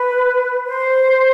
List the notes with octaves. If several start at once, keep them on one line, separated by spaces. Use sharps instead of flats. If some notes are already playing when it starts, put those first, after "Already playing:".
Already playing: B4
C5